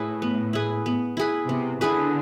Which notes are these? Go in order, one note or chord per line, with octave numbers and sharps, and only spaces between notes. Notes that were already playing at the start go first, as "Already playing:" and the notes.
Already playing: A2 E4 G#4 B4
B3
E4 G#4 B4
B3
E4 G#4 B4
C3 B3
D3 E4 G#4 B4